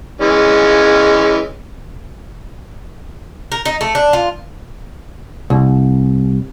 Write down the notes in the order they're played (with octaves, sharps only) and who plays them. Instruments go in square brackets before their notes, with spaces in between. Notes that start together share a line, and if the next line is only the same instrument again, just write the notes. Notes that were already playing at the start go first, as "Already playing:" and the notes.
[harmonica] E3 G#3 C#4
[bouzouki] A#4
D#4
A3
D4
F4
[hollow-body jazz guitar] C2